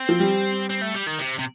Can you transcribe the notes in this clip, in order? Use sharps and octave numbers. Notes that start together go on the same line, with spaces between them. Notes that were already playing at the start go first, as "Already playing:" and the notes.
Already playing: C4
F3
G3
C4
A3
G3
D#3
C3
C3